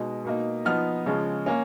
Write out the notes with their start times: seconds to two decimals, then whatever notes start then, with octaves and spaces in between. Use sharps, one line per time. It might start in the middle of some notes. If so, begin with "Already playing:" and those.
Already playing: B2 G#3 D#4
0.25 B2 A#3 D#4
0.65 F3 B3 D#4 F6
1.06 C#3 F3 G#3
1.46 A#3 C#4